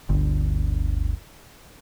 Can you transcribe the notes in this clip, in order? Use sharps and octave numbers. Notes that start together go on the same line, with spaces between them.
G1 D2